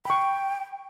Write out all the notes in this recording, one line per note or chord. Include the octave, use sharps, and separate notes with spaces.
G5 B5 C#6